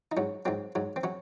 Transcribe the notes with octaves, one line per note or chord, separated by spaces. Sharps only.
D#4
G#2 F#3 C#4
G#2 F#3 C4
G#2 F#3
C4
F#3 C#4